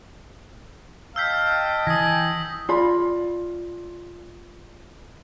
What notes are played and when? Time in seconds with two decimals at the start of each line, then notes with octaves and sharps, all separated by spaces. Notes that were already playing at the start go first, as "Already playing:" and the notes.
1.16 D#5 F5 G5 A5 E6 G6 B6
1.87 E3 G#5 D#6 A#6
2.69 F4 D5 B5